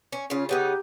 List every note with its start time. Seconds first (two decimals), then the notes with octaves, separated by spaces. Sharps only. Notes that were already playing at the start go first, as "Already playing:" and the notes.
0.13 C#4
0.30 C#3 C#4 F4
0.49 C#3 B3 D#4 G4